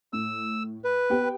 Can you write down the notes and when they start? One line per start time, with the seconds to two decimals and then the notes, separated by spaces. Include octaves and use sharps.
0.13 A2 E6
0.84 B4
1.10 B3 G4 G5